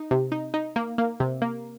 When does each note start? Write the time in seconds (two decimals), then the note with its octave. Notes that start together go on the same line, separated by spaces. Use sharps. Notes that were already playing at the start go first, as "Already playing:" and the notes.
Already playing: D#4
0.11 C3
0.32 D#4
0.54 D#4
0.76 A#3
0.98 A#3
1.20 C3
1.42 A#3